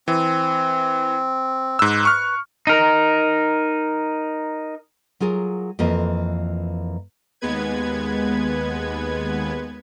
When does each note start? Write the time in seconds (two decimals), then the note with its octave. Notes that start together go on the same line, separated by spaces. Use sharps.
0.08 E3 C4
1.79 G#2 B4 E6
2.05 C#6 F6
2.67 D#4 A#4
5.20 F#3 F4 G#4 A#4
5.79 F2 E3 A#3 F4 D#5
7.41 D#2 G#3 B3 B4 G#6